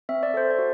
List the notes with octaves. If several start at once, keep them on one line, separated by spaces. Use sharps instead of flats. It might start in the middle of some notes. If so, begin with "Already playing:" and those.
C4 E5
D5
A4 C5
D5
F#4